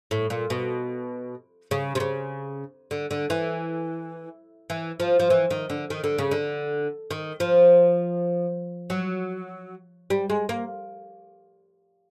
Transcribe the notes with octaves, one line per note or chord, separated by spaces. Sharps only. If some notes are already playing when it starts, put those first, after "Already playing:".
A2
A#2
B2
C#3
C3
C#3
D3
D3
E3
E3
F3
F3
E3
D#3
D3
D#3
D3
C#3
D3
D#3
F3
F#3
G3
G#3
A#3